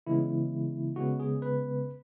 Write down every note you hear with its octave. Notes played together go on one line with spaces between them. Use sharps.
C#3 E3 G#3 B3 E4
C#3 G#3 B3 F#4
G#4
B4